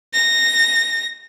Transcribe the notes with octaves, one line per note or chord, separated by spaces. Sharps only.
A#6